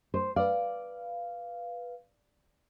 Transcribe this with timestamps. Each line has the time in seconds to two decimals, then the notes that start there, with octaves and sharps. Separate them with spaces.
0.14 C5
0.36 B4 D5 F5